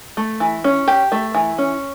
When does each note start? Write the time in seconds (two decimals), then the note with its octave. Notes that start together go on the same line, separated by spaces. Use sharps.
0.17 A3
0.40 E3
0.64 C#4
0.88 G4
1.12 A3
1.35 E3
1.58 C#4